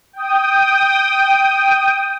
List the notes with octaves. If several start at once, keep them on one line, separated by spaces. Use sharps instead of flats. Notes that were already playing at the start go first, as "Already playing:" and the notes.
G5 D#6